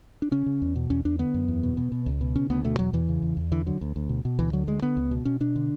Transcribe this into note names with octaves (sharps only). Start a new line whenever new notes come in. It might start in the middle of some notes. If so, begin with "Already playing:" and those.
D4
C#3 C#4
C#3
E2
B2
E2 C#4
E2 D4
D3 B3
F#2
E2
B2
B2
B2
C#2
B2
C#3 C#4
D2 B3
B2 A3
E2 F#3
E2 E3
C#3
E2
E2
D3 E3
D3 F#3
D2
D2
B2
B2
D2 E3
D3 F#3
D2 G#3
D3 B3
C#2
B2
B2 C#4
B2 D4
D3